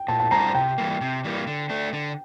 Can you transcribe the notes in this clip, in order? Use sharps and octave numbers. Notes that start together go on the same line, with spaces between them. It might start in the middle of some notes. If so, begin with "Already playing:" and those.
Already playing: G5
A#2 A5
A5
G3 D4 F4 C5 A#5
C3 G5
E3 G3 A#3
C3
E3 G3 A#3
D3
A3 D4
D3